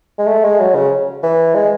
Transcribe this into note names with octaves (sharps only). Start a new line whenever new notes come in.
G#3
A3
G#3
F#3
C#3
E3
G#3